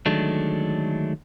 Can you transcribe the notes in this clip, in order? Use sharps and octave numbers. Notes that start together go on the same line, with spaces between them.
D3 D#3 F#3 G#3 A3 D4